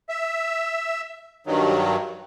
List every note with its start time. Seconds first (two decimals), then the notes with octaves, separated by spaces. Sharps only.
0.09 E5
1.47 G2 D#3 F#3